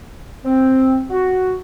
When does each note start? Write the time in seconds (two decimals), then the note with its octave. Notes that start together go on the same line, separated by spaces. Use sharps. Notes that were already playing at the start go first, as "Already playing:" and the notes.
0.45 C4
1.11 F#4